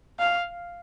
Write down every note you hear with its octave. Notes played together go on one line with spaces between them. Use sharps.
F5